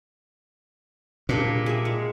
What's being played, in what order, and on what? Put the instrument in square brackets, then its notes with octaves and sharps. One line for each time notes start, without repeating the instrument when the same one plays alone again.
[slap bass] A#2 [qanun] G3 D4 G#4
[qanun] G#4 E5
G#3